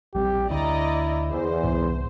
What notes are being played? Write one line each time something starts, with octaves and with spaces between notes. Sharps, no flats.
A#1 G3 C4 G4
D2 D3 E4 D5 D#5 A#5
E2 C5
C2 G#2